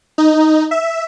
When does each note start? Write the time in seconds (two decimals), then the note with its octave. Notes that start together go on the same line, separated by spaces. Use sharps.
0.18 D#4
0.71 E5